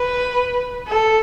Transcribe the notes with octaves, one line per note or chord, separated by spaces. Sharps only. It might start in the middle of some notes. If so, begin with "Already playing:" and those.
Already playing: B4
A4